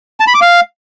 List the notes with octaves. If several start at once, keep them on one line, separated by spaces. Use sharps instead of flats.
A5
B5
D6
F5